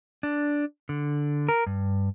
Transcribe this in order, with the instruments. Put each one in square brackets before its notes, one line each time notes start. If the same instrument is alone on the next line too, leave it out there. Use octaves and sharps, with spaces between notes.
[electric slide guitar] D4
D3
A#4
G2